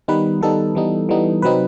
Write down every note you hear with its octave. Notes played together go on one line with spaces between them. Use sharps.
D#3 G3 B3 D#4 B4
D#3 G3 B3 D#4 A4
E3 G3 B3 D#4
E3 G3 B3 D#4
C3 F#3 C4 D#4 B4